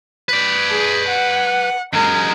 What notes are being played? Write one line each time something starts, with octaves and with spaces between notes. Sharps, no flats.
B4 D5
G#4
F#5
F#2 G#3 A#4